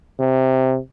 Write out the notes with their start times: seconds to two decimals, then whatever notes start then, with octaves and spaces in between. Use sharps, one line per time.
0.19 C3